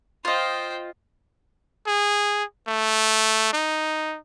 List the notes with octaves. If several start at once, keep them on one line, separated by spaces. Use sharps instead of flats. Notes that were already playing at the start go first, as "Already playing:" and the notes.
F4 C5 D#5 G5
G#4
A3
D#4